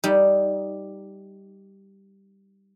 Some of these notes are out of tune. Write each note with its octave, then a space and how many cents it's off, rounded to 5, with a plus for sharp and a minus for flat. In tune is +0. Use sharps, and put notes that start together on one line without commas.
G3 +0 D#4 +10